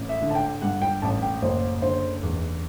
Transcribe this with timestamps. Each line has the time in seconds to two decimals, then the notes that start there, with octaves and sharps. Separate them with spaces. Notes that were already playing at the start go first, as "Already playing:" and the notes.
Already playing: A1
0.09 E5
0.22 D3
0.30 A5
0.35 G5
0.62 G2 F#5
0.82 G5
1.02 A1 A5
1.22 G5
1.42 F#1 C5
1.82 D3 C5
2.23 E2